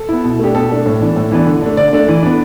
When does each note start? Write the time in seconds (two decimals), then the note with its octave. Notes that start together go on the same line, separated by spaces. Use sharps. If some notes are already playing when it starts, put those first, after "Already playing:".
Already playing: A4
0.09 B3 E4
0.24 B2
0.39 A3 D4 G4
0.55 B2 A4
0.70 A3 D4
0.86 A2
1.01 E3 B3 D4
1.16 A2
1.32 E3 B3 D4
1.47 D3
1.62 A3 D4
1.77 D3 D5
1.93 A3 D4
2.08 E3
2.23 B3 D4